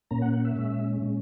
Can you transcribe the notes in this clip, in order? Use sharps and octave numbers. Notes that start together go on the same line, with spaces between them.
A#2 A#3 C#4 A#5
F#5
F#5
E5
A#2 G#3 C#4
A#2 G#3 C#4